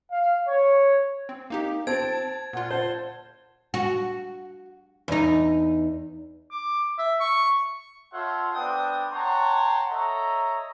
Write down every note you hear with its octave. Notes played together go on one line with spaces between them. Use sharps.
F5
C#5
C4
A#3 D#4 G4
C4 A5 G#6 D7
A#2 F4 F#5
C5 A5 G7
F#4
E2 D#4
D6
E5
C#6
F4 A4 C#5 E5 F#5 C6
B3 C4 D4 A4 G5 D#6
C#5 F#5 G5 A5 A#5 C6
A4 C#5 D#5 E5 A#5